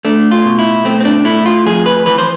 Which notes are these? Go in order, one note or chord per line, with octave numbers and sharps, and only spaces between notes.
A3 D4
F4
B2
E4
A3 C4
C4
D4
A3 E4
F4
F2 G#4
B4
E3 B4
C5